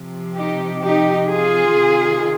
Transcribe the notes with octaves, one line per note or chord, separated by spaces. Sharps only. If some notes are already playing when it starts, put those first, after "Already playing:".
Already playing: C3 F3
D#4 G4
D#4 G4
F4 G#4
C3 D#3